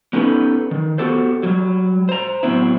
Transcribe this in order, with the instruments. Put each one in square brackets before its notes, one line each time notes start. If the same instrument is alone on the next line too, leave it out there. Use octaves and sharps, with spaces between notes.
[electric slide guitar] B3 C#4 D#4 G4 A4 B4
D#3
B3 F#4 G4 A4 C5
F#3 G3
C5 A#5
A2 F#3 B3 C4 E4